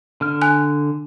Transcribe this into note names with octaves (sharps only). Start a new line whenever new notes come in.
D3 F6
G#5 F#6